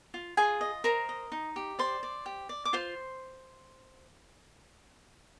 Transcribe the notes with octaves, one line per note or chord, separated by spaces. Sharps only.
F4
F4 G#4 G#5
D#5
A#4 C5 A#5
D#5
D#4
G4
C5 D5 C6
D5
G4
D5
D6
F4 C5 C6